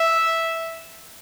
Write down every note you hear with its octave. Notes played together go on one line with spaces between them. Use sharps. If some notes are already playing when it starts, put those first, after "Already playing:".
Already playing: E5